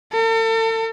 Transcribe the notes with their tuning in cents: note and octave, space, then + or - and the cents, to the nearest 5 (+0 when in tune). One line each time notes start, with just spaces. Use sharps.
A4 +40